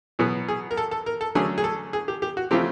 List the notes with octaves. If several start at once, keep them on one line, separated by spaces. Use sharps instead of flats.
B2 F#3 B3 G#4
G#4
A#4
A4
A4
A#4
A4
D3 F#3 A3 C#4 G#4
G#4
A4
G#4
G4
G4
F#4
C#3 F3 A3 C4 G4